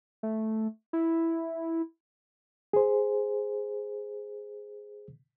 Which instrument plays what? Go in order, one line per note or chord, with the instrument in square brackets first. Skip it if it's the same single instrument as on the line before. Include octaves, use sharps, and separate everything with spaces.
[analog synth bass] A3
E4
[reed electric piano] G#4 C5